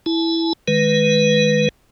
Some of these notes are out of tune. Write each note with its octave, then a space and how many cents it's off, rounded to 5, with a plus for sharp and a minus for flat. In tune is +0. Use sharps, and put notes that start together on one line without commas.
E4 +0 A5 -40
D#3 +0 G#3 +5 B4 +0